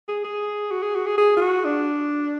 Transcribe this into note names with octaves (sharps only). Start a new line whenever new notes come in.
G#4
G#4
F#4
G#4
F#4
G#4
G#4
F4
F#4
D4